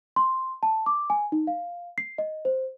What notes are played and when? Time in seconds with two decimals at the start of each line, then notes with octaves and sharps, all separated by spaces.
0.16 C6
0.63 A5
0.86 D6
1.10 G#5
1.32 D#4
1.47 F5
1.98 C7
2.18 D#5
2.45 C5